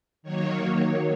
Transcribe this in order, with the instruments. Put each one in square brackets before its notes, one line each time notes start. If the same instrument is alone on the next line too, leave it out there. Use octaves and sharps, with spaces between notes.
[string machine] D#3 F#3 A#3 C#5